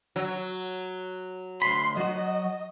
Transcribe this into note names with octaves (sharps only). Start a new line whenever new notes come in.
F#3
D2 B5 C6
F#3 F#4 D#5